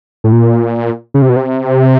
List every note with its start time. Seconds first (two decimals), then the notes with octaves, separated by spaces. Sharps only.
0.24 A2
0.32 A#2
1.14 C#3
1.22 C3
1.29 B2
1.36 C3